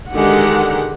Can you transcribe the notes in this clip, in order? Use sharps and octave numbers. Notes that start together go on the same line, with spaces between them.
D3 D#3 G#3 D#4 G4 F#5